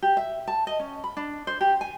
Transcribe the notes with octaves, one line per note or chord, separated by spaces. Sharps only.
G4
E5
A5
D#5
C#4
B5
D4
C5
G4
G#5